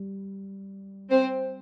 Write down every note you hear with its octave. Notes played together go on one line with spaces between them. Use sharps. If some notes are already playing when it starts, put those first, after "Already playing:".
Already playing: G3
C4 C5